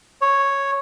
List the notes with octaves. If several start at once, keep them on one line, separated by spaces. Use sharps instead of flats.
C#5